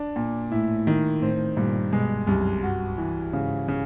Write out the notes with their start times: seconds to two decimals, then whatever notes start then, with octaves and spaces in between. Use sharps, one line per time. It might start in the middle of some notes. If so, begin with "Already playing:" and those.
Already playing: D4
0.16 A#2
0.52 A2 E4
0.87 D#3
1.21 A2 C4
1.57 G2 A#2
1.92 B2 G#3
2.27 C2 F#2
2.63 G2 F#4
2.98 E3
3.33 G#2 C#3
3.68 C#3